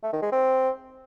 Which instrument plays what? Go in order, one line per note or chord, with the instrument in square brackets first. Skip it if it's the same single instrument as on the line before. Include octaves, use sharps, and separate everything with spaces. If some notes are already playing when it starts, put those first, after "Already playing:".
[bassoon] A3
D#3
G#3
C4